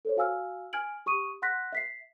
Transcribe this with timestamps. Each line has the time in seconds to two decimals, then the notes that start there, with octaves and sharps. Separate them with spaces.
0.05 A4 C5 C#5
0.17 F#4 F5 G#5 E6 F6
0.73 G#5 F6 G#6 D7 F#7
1.06 G4 C#6 D#6 D#7
1.42 F#5 C6 F#6 A#6 B6
1.72 E5 B6 C7